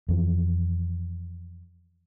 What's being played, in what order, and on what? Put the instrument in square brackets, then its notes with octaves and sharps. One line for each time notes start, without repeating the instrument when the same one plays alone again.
[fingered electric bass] F2 E3 F3